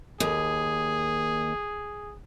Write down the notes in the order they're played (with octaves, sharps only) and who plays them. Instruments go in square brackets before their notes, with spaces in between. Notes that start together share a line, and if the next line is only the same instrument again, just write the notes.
[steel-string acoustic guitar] D#2 [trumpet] G#4